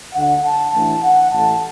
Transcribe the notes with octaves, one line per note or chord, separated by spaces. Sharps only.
D2 D3 A3 D4 F#5
A5
A1 A2 E3 A3 D4
F#5
A1 A2 A3 A5